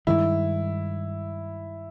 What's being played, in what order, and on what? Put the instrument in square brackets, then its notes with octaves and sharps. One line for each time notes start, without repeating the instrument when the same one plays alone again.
[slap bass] G2 D#3 G#3 [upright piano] E4